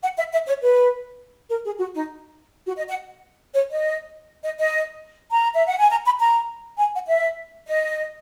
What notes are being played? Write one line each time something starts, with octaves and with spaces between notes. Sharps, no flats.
F#5
E5
E5
C#5
B4
A#4
G#4
F#4
D#4
F#4
D#5
F#5
C#5
D#5
D#5
D#5
A#5
E5
F#5
G#5
A#5
B5
A#5
G#5
F#5
E5
D#5